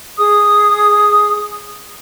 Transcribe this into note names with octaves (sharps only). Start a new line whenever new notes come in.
G#4 D#6